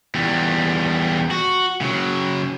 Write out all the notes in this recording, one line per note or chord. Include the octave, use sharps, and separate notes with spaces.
E2 G3
F#4
C#3 F#3